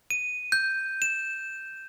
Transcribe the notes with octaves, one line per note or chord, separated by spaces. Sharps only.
D#7
G6
E7